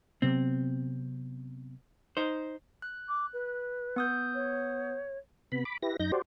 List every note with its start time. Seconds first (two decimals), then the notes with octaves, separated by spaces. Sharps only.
0.22 C3 F#3 B3 C4
2.17 D#4 C5
2.82 F#6
3.08 D6
3.33 B4
3.96 B3 D#6 G6
4.34 C#5
5.52 C3 B3 B5
5.65 B5 D6
5.82 E4 G4 B4 A#6
5.99 F#2 D#4 G6 A#6
6.12 F#4 G4 C5 D5